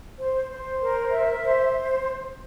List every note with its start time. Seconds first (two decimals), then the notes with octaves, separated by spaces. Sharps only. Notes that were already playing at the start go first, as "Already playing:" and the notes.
0.18 C5
0.50 C5
0.81 A#4
1.13 E5
1.44 C5